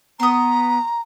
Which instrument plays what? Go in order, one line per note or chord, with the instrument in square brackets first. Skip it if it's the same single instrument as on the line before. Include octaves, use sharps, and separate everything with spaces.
[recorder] B3 [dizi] A#5 [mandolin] C6 D#6